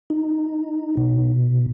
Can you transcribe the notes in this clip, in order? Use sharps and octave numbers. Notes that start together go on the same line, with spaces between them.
D#4
B2